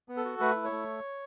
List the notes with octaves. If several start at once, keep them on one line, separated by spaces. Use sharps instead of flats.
B3
A4
F#4
A3 B4
E4
C#5
A3